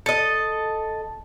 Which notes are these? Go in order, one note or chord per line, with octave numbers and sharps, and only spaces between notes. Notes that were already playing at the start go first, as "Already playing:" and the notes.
A4 D#5